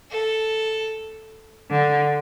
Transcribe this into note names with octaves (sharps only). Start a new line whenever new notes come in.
A4
D3